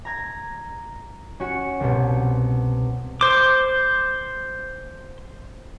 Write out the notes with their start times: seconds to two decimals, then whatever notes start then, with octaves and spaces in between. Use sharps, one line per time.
0.05 A#5 G#6 A#6
1.40 C#4 F#4 C#7
1.80 C2 B2
3.21 C5 D6